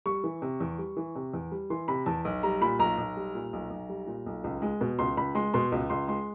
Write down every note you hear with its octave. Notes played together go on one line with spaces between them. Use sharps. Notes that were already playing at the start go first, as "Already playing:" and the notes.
G3 C#6
E3
C3
E2
G3
E3
C3
E2
G3
E3 C6
C3 B5
E2 A5
B1
G3 A#5
A#2 B5
B1 A#5
B1
G3
A#2
B1
B1
G3
A#2
B1
C#2
G#3
B2
C#2 C6
C#2 B5
G#3 C6
B2 C6
C#2
C#2 C6
G#3 C6